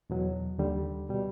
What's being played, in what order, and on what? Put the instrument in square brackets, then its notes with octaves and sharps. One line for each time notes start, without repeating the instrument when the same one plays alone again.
[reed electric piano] E2 B2 F#3
D#2 D3 G3
B2 G3